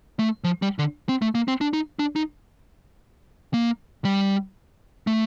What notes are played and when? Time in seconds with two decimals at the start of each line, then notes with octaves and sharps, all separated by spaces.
0.19 A3
0.44 F3
0.62 G3
0.79 D3
1.09 C4
1.22 A3
1.35 A#3
1.48 C4
1.61 D4
1.73 D#4
1.99 D4
2.16 D#4
3.54 A#3
4.05 G3
5.07 A3